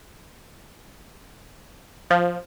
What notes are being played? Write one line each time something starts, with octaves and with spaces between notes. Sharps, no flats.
F3